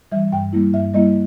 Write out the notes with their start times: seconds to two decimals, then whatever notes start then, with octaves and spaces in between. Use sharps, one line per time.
0.12 E3 G3 E5
0.32 G2 G5
0.53 G3 A#3 E4
0.73 G2 E5
0.94 G3 A#3 E4 D#5